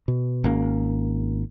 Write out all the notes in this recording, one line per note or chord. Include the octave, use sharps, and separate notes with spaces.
B2
G#1 A#3 C#4